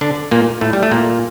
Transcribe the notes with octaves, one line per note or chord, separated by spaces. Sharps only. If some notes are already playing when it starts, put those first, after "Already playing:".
D3 D4
A#2 A#3
A2 A3
G3
A3
A#2 A#3